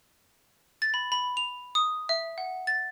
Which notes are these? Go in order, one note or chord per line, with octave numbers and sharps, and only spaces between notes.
A6
B5
B5
F7
D#6
E5
F#5
A6